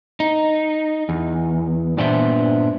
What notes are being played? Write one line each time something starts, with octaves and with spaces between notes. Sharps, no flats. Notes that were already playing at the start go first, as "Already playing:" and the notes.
D#4
E2
G2 A#2 B3 D4 C5 E5